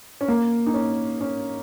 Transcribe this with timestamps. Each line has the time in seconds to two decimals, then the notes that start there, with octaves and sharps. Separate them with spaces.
0.21 C#4
0.28 A#3
0.66 D#4
0.74 C#4
1.21 C#4